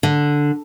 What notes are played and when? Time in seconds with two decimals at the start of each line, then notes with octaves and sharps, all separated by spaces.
0.03 D3